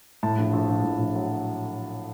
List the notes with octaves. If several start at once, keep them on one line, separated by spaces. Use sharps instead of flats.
A2 A5
A#1
A#1
A#1
A2
A#1
F#3